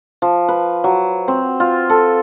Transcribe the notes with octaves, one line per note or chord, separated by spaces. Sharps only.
F3
B4
F#3
C4
F4
A4